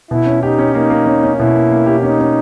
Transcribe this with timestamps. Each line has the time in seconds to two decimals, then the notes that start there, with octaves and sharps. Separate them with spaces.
0.11 B2 E4
0.26 C#4
0.42 D#4 G4
0.59 C#4
0.75 A#3 D#4
0.90 A#3
1.06 C#4
1.23 C#4
1.39 B2 E4
1.55 A#3
1.72 A#3
1.86 G4
2.03 C#4 D#4
2.20 C#4